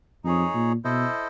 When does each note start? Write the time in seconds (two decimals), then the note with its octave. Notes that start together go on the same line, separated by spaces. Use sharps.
0.24 F2 D#4 G#4 C#5
0.55 A#2
0.84 B2 E4 A4 C5 D#5